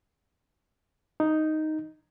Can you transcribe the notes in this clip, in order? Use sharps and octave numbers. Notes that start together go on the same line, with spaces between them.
D#4